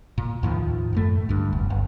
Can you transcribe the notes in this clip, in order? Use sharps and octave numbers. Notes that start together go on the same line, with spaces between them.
A#2
D#2 A2 D#3 F3
F#2 A2 A3
D2 G2
F1
G1